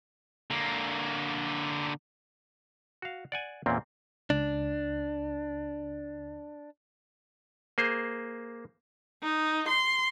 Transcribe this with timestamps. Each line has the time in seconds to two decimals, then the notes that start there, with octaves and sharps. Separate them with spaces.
0.50 D3 A#3
3.02 F#4 F5
3.32 D5 F#5 G#5
3.66 E2 A#2 A#3 C4 C#4
4.30 C#2 D4
7.78 A#3 G#4 C5
9.23 D#4
9.68 C6